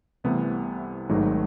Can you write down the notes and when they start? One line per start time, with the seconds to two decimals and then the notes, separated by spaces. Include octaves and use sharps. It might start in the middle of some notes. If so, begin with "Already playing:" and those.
0.24 C2 C3 E3 A3 B3
1.09 G#1 G#2 D#3 F#3 A3